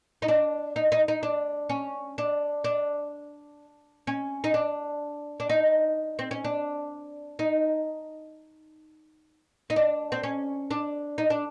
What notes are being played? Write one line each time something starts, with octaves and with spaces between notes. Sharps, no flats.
D#4
D4
D#4
D#4
D#4
D4
C#4
D4
D4
C#4
D#4
D4
D4
D#4
C4
C#4
D4
D#4
D#4
D4
C4
C#4
D4
D#4
D4